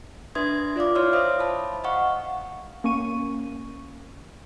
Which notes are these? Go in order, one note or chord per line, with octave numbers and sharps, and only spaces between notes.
D4 B4 E5 C6 D#6 G#6
F4 D5 F5 D6
E4 C#5 C6 E6 F6
C5 E5 F5 D#6 E6
A5 B5
D#5 F5 F#5 C#6
A#3 C#4 C#6 D#7